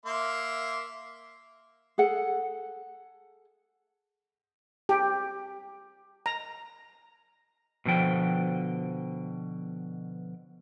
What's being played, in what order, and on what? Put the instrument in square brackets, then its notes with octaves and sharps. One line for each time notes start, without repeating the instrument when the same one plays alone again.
[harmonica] A#3 E5 C6
[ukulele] G#4 A4 F#5
[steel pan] G4
A#5
[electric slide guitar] B2 D3 F3 G5